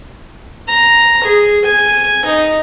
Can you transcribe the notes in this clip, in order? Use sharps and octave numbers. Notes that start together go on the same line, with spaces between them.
A#5
G#4
G#5
D#4